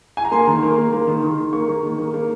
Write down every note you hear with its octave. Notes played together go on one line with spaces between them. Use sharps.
G#5
A#5
A#3 C6
D#3
A#3
A#3
A#3
D#3
D#3
D#3
A#3 C#6
A#3
D#3
A#3
A#3